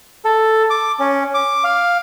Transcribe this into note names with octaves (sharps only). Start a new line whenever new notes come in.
A4
D6
C#4
D6
F5